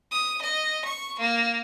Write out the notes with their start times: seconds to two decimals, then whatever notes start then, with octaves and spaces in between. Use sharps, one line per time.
0.11 D#6
0.42 D#5
0.85 C#6
1.19 A#3